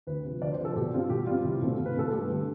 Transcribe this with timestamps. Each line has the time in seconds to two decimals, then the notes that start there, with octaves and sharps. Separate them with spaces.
0.07 D2 B4
0.24 C3 F3
0.41 D2 D5
0.53 C5
0.58 C3 F3
0.65 A4
0.76 B2 G4
0.93 G3 C4 F4
1.10 B2 G4
1.27 G3 C4 F4
1.45 C2
1.62 B2 A3 C4
1.79 C2
1.86 B4
1.96 B2 A3 C4 A4
2.13 G2 G4
2.30 D3 G3